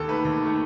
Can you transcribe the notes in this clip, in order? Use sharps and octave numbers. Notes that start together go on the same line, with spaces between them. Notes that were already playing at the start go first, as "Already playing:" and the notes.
Already playing: D#2 A4
D#3 A3 B4
D#2
D#3 A3